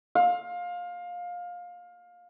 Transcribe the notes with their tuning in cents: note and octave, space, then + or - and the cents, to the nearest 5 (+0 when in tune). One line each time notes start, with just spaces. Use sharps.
F5 +20